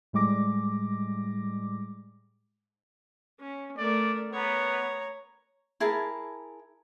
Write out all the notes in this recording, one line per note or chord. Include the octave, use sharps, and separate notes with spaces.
A2 G3 G#3 D6 A#6
C#4
A3 A#4 D5
B3 C#5 A#5
E4 G#4 A#4 A5